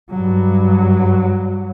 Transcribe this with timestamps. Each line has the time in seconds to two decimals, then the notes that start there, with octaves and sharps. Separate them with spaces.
0.11 G2 F#3